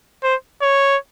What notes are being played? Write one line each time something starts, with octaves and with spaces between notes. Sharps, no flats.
C5
C#5